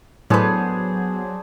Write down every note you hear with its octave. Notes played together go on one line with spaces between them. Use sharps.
A2 F#3 B3 D4 G#4 B4 C5